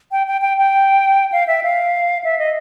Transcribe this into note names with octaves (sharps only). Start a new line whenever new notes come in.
G5
G5
G5
G5
F5
E5
F5
E5
D#5